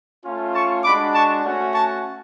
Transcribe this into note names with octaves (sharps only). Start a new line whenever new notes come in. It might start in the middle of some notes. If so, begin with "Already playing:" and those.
A3 C#4 F4
A5 C#6
G#3 D4 F#4 B5 D6
A5 C#6
A3 C#4 F#4
A5 C#6